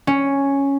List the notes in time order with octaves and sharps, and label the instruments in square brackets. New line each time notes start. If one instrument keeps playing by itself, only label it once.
[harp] C#4